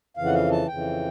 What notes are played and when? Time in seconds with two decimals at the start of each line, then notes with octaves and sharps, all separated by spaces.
0.17 F2 C#3 E3 F5
0.26 F#5
0.34 F5
0.52 A5
0.68 F2 C#3 E3 G5